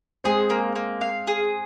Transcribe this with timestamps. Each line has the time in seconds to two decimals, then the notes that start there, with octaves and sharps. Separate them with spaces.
0.24 G#3 C4 G#4
0.50 A#3
0.76 A#3
1.01 F5
1.27 G#4